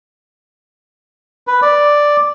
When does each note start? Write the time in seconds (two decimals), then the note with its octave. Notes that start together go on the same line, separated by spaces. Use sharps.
1.47 B4
1.62 D5